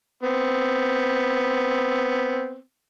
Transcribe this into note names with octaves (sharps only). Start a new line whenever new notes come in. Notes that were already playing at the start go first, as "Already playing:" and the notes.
B3 C4